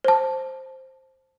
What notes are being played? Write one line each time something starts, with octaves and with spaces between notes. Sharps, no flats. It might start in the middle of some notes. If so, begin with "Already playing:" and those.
C5 A5